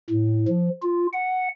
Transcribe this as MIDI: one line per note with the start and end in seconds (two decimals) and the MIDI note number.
0.10 0.46 45
0.48 0.69 53
0.82 1.06 65
1.13 1.49 78